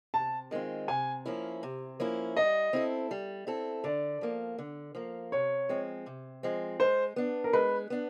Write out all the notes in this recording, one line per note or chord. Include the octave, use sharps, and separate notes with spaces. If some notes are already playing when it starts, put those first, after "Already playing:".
C3 A5
D#3 G#3 C4 F4
C3 G#5
F3 A#3 C#4 E4
C3
F3 A#3 C#4 E4
G3 D#5
C4 E4 A4
G3
C4 E4 A4
D3 D5
F3 A#3
D3
F3 A#3
C3 C#5
F3 G#3 C4
C3
F3 G#3 C4
G#3 C5
B3 D4
A#4
G#3 B4
B3 D4